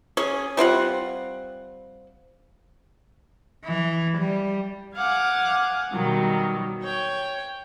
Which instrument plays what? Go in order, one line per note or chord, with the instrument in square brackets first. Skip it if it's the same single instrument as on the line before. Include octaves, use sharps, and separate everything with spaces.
[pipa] C#4 G#4
G3 C4 F4 F#5
[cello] E3
G3
[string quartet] F5 F#5 G#5 D6
B2 D#3 F#3 G3
C#5 G5